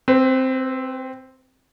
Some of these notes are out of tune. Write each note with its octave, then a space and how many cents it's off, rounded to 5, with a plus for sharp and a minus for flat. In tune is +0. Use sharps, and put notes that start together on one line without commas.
C4 +0 B4 +35